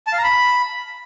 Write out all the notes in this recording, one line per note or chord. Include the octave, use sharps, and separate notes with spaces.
A5
F5
A#5
B5